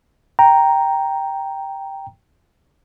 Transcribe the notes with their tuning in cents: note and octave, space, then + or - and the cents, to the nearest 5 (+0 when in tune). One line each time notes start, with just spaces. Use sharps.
G5 +0 A#5 +0